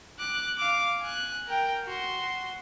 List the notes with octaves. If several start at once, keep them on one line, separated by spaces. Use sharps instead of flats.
D6 F#6
F5 D6
G#5 F#6
A#4 G5
F#4 C6